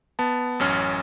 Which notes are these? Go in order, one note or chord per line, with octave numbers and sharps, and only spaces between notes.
B3 A5
A1 F#2 C#4 F6